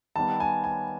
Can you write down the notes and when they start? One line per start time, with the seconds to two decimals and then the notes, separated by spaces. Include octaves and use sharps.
0.16 D#3 G3 B3 A5
0.40 G#5
0.64 G#5